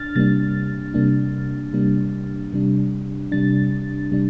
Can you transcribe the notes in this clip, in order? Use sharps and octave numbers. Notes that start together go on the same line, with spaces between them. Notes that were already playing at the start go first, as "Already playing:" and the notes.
Already playing: D4 F6 A6
C3 G3 A#3 D4 A6
C3 G3 A#3 D4
C3 G3 A#3 D4
C3 G3 D4
C3 G3 D4 A6
C3 G3 D4